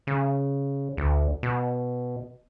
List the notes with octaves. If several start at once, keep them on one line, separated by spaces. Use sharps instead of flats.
C#3
D2
B2